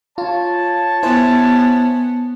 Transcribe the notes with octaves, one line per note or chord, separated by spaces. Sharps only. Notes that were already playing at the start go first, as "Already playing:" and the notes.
F4 C#5 A5
B3 E4 C5 G#5